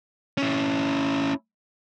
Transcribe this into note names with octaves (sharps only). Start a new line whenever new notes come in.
C#4 E4